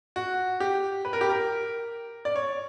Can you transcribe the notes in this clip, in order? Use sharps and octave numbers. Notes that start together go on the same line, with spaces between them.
F#4
G4
B4
A#4
G4
A#4
D5
C#5